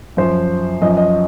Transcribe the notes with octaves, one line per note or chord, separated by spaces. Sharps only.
F#2 F3 C5
F#2 F3 D#5
D#5